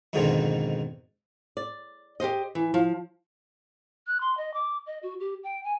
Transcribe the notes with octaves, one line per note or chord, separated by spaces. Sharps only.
F2 G#2 B2 D3 D#3 F3
D5
G4 A4 C5 D#5
E3
F3
F#6
C6
D#5
D6
D#5
F#4
G4
G5
G#5